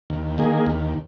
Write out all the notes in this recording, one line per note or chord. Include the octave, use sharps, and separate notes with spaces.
D#2
D#3 A#3 G#4
D#2